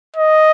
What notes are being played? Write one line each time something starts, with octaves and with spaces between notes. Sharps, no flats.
D#5